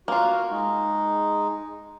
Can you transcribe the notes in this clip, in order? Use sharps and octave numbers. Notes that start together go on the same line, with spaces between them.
A#3 F4 F#4
G#3 D#4